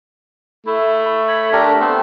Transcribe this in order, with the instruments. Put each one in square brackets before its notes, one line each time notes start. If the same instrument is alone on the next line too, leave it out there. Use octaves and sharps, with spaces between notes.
[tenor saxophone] A3 [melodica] E4
[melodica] C#5 B5
D4 G4 A#4
A3 B3 C4